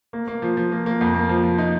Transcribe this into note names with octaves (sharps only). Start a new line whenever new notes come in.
A#3
A#3
F3
F3
A#3
A#3
F2
A#3
F3
F3
D#4